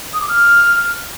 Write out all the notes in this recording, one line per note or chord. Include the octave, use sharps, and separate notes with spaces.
D#6
D6
F6